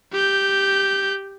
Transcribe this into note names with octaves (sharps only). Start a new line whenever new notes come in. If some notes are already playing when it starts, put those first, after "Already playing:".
G4 G6